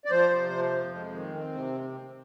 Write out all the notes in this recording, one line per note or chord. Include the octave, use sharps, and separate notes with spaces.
D5
F3 C5
C3
F3
F2
G#3
D#3
C4
C3